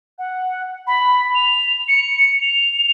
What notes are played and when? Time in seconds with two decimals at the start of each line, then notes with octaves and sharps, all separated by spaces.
0.19 F#5
0.87 B5
1.35 F7
1.88 C#7
2.42 F7